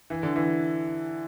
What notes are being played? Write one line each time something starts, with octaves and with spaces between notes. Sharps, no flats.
E3
D3
E3